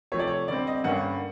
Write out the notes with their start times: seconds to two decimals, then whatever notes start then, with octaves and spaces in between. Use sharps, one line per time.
0.12 C3 F3 A3 C#5
0.19 D5
0.27 C#5
0.48 D3 G3 C4 D5
0.67 D#5
0.84 G2 D3 G3 A#3 C#4 F#5